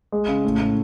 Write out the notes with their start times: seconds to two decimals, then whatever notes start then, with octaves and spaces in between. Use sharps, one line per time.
0.12 G#3
0.28 C#3
0.45 A2
0.60 A2